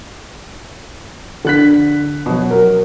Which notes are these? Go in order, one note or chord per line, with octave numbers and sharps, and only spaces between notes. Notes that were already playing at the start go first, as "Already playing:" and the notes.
D3 F#6 B6
B2 F#3
F#4 A#4